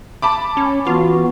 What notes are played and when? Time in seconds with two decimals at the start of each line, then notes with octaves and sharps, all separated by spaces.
0.22 A5 B5 D6
0.57 C#4
0.87 E3 B3 F4 F#4